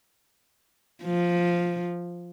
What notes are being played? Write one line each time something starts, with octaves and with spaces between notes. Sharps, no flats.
F3